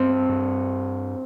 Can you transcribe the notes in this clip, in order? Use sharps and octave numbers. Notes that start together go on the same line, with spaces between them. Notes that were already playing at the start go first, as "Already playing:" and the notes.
Already playing: G2 C4
G2